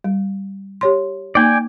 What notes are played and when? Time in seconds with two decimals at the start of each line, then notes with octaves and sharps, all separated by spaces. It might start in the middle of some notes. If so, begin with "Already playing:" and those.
0.04 G3
0.81 G4 C#5 C6
1.35 A#3 D#4 D5 G5 G#5